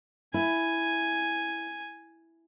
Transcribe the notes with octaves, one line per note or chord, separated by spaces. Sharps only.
E4 G#5